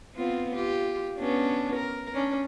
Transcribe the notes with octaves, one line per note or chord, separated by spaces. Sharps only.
B3 C4 F4
F4 G4
B3 C#4 D4
A#4
C#4 D4